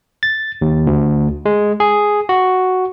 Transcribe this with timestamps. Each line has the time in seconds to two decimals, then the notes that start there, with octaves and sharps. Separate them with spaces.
0.23 A6
0.62 D#2
0.87 D2
1.46 G#3
1.80 G#4
2.29 F#4